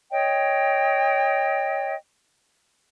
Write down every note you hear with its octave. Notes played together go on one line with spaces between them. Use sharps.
C#5 D#5 G5